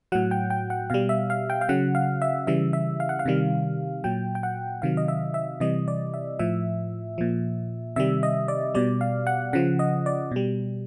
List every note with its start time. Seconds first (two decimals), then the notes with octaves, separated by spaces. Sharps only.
0.12 A2 F#3 F#5
0.31 G5
0.50 G5
0.70 F#5
0.90 B2 G3 F5
1.09 E5
1.30 F5
1.50 G5
1.61 F5
1.69 C#3 F#3 F#5
1.95 F5
2.22 E5
2.47 C#3 E3 G3 E5
2.73 E5
3.00 F5
3.09 F#5
3.19 F5
3.26 C3 D#3 G3
4.04 A#2 F#3 G5
4.35 G5
4.43 F#5
4.82 C3 D#3 F#3 F5
4.97 D#5
5.08 E5
5.34 E5
5.60 C3 E3 G3 D#5
5.88 D5
6.14 E5
6.39 A2 F3 E5
7.18 A#2 F3
7.96 C3 D#3 G3 E5
8.23 D#5
8.48 D5
8.75 B2 G3 D5
9.01 F5
9.27 F#5
9.53 C#3 F3 F#5
9.79 D#5
10.06 D5
10.31 B2 G3